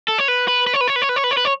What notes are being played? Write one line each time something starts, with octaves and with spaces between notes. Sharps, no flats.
A4
C#5
B4
B4
B4
C#5
B4
C#5
B4
C#5
B4
C#5
B4
C#5
B4
C#5